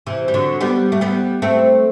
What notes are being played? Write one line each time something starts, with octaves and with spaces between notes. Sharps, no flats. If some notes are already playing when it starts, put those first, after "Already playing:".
C3 E3
G3
D3 F#3
G3 B3
A3
G3 B3
A3 C4